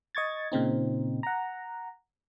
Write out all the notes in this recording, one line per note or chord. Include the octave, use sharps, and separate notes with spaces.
D#5 C#6 G#6 A6
A#2 C#3 C4 D#4
F#5 A#5